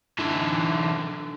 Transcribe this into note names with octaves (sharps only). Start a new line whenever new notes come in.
D3 E3